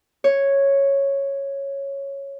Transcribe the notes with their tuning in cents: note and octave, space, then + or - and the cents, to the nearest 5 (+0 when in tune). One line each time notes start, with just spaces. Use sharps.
C#5 -5